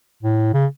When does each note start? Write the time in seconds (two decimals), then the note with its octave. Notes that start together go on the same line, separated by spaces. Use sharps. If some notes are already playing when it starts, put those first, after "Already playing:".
0.23 A2
0.54 C#3